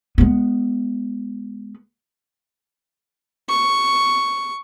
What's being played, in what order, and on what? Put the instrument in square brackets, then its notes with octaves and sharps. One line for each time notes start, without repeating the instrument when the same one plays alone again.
[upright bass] G#3 B3
[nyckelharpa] C#6